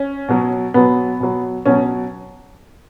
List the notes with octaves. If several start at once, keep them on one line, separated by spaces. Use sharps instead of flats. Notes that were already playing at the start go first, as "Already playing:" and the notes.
Already playing: C#4
B2 F#3
B2 F#3 B3
B2 F#3
B2 F#3 C#4